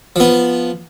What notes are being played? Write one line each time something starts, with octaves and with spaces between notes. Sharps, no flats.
F3 B3